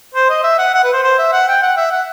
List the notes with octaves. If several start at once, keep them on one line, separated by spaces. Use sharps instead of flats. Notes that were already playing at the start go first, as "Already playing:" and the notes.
C5
D#5
E5
F#5
F#5
B4
C5
C5
E5
F#5
G5
F#5
E5
F#5